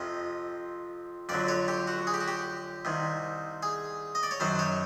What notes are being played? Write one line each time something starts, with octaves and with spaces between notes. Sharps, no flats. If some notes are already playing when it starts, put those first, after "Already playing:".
Already playing: F2 C3 F3 D#5
F2 D3 F#3 D5
C#5
G4
F#4
G#4
G4
F#4
G4
C2 C3 D#3
G#4
D#5
D5
C#5
F#2 D#3 F#3 C5
C#5